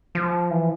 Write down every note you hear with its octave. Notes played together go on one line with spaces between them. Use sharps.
F3
E3